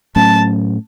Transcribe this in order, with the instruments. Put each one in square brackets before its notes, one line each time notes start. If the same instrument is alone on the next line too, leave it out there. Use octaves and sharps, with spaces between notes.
[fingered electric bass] A2 F#3 A3 C#4 [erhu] A5